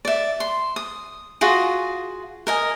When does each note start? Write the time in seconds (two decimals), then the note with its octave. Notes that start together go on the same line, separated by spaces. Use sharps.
0.05 D5 E5
0.40 C6
0.76 D#6
1.41 F4 F#4 G#4
2.47 A#4 D#5 G#5